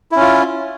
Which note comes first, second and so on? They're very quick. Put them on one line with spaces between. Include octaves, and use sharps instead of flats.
E4 C#4 F4